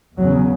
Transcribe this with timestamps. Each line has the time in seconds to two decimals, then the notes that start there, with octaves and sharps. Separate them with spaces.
0.17 E2 C#3 F#3